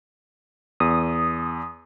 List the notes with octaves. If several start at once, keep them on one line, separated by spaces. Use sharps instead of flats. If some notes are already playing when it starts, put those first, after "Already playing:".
E2 D#6